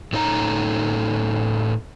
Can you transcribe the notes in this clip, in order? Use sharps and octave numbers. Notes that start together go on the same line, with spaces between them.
A2 A3 C#4 D#4 D5 A#5